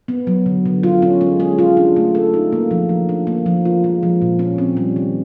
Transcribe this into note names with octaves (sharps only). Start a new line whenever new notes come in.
B3
F#3
D3
D3
F4
C#4
G#3
G#4
F4
D4
A3
A4
D#4
A#3
F3
F3
D4
A#3
F3
F4
G#3
F3
A#2
C#4
C4
G3
D#3